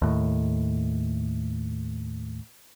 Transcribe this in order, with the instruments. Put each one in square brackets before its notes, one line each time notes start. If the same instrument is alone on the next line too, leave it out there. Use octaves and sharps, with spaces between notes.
[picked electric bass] D#2 A2